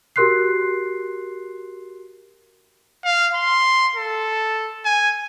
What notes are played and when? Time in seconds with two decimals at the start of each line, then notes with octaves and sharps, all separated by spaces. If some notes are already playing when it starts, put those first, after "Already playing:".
0.16 F#4 G4 A#4 C6 F#6 C7
3.04 F5
3.35 C6
3.95 A4
4.85 G#5